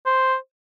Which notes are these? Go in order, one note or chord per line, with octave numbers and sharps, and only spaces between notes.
C5